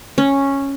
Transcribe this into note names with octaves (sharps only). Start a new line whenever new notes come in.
C#4